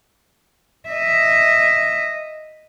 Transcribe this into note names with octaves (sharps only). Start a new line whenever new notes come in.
D#5 E5